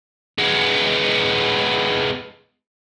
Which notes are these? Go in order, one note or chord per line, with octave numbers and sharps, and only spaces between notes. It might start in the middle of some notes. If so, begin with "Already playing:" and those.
G#3 B3